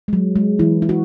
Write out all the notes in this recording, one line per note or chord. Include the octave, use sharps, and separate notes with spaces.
G#3
F#3
G#3
E3 E4
E4
F#4